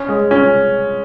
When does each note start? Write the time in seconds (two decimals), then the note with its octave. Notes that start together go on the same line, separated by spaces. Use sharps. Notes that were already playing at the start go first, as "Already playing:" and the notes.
Already playing: C#4
0.09 G#3
0.31 C#4